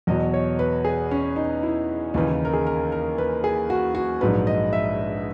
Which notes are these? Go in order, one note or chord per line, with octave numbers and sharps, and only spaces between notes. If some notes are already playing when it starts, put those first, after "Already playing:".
E2 B2 F#3 D#5
C#5
B4
G#4
C#4
D#4
E4
D#2 C#3 E3 D#4
E4
A#4
G#4
A#4
A#4
B4
G#4
F#4
F#4
A#1 G#2 F#3 B4
D#5
E5